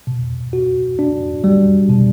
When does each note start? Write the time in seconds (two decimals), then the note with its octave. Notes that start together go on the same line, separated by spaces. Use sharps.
0.07 B2
0.53 F#4
0.99 D4
1.44 G3
1.89 B2